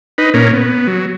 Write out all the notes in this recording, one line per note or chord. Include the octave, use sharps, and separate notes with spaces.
D#4 B4
A#2 C#4 A#4
B3
F#3